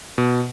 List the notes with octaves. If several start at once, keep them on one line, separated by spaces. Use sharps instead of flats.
B2